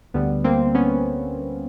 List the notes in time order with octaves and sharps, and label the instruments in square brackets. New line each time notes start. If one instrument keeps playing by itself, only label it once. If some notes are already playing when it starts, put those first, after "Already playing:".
[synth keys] D2 D3 G3 B3
A#3 C4
B3 C#4